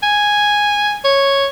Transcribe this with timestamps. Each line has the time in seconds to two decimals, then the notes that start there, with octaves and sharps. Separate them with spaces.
0.03 G#5
1.04 C#5